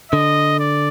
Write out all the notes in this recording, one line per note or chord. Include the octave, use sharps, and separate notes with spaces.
D3 D#5
D5